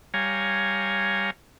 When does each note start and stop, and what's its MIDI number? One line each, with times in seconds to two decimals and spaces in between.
0.14 1.31 55
0.14 1.31 73
0.14 1.31 77
0.14 1.31 80
0.14 1.31 82